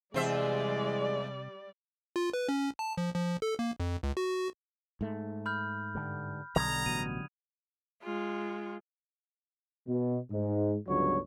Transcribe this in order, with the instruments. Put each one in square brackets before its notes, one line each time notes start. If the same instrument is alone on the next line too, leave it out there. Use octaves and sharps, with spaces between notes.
[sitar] E2 C5 E5 [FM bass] C3 [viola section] G3 D5 [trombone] G#3
[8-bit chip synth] F4
B4
C#4
A5
F3
F3
A4
A#3
F2
C#2
F#4
[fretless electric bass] G#2 A3
[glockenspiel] B5 F6 G6
[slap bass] G2 D3
[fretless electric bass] B1 [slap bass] D3 F#3 G3 [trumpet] A#5 [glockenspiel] D#6 G#6 F7
[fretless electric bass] A1 B2 [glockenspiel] D#7
[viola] G#3 F4
[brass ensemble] B2
G#2
G1 C#2 D3 F#3 C#5